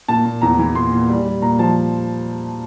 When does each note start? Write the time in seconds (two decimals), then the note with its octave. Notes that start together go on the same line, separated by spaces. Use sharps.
0.08 A#2 A5
0.25 A#2
0.41 E2 A#5
0.59 E3
0.75 A#2 C6
0.92 A#2
1.09 G3
1.26 G3
1.42 A#2 A#5
1.59 F3 A5